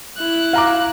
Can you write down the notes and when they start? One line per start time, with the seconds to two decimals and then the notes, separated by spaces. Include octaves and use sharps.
0.18 E4 F#6
0.53 F5 A#5 D6